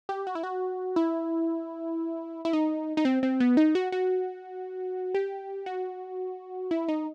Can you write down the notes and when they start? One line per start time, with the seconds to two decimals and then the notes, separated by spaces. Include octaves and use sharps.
0.09 G4
0.27 F#4
0.35 E4
0.43 F#4
0.96 E4
2.45 E4
2.53 D#4
2.97 D#4
3.05 C4
3.23 C4
3.40 B3
3.57 D#4
3.75 F#4
3.92 F#4
5.14 G4
5.66 F#4
6.71 E4
6.88 D#4